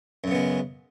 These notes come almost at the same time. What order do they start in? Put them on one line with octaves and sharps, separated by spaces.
F#2 C#3 B3 G#3